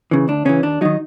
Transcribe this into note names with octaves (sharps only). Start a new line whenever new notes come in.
C#3 E3
D2 D4
C#3 E3 C#4
D#2 D4
D#3 F#3 D#4